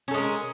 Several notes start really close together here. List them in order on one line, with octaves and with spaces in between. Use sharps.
C#4 A4 G#3 A#4